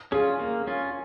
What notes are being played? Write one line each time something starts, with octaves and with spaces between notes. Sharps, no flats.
C#4 F4 G#4
A#3
C#4 F4